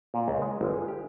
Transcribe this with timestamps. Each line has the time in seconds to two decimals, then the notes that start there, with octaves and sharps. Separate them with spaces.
0.14 A#2
0.28 C#2
0.42 G#3
0.61 G1
0.74 G#4
0.88 G4